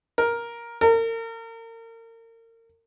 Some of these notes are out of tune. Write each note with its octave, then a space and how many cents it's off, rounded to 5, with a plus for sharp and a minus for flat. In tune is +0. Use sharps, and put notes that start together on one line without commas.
A#4 +10
A#4 -35